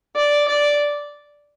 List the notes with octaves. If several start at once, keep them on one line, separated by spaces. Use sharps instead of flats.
D5
D5